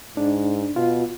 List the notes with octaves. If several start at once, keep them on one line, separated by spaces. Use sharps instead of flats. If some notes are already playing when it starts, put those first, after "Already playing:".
G#2 D4
B2 F4